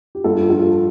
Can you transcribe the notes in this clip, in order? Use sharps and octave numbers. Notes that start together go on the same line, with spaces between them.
G4
G2 F4 A4
F3 F4 A4